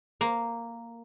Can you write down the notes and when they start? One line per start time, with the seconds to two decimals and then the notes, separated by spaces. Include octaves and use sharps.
0.21 A#3